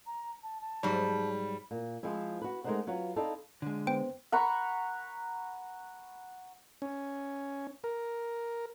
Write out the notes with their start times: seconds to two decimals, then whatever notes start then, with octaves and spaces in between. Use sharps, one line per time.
0.06 A#5
0.43 A5
0.61 A5
0.83 G#2 F#3 G3
1.71 A#2
2.03 F3 G#3 C4 E4
2.42 F#4 B4
2.64 G#3 A3 D#4 A#4 C5 F#5
2.87 F#3 F4 B4 C#5
3.16 C4 D#4 E4 A4 D5 F5
3.62 D3 G#3
3.87 B3 C5 G5
4.32 F#5 A#5 B5 C#6
6.82 C#4
7.84 A#4